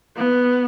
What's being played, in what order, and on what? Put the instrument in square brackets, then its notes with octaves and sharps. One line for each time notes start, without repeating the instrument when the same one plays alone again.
[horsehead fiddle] B3